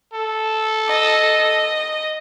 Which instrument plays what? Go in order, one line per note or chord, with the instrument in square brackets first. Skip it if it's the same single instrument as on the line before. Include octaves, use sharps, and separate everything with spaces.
[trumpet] A4
[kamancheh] D#5